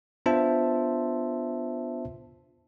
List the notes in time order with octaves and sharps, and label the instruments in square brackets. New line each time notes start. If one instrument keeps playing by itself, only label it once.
[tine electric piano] B3 D4 F4 C5 E5 A5